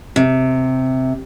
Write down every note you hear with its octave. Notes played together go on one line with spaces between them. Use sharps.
C3